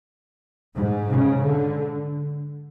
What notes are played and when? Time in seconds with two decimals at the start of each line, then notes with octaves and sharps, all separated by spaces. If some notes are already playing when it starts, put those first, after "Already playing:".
0.76 G#2
1.11 C#3
1.45 D3